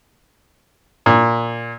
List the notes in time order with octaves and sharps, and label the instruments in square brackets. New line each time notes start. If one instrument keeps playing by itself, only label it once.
[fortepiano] A#2